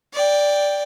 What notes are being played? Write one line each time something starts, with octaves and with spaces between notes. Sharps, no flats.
D5 G5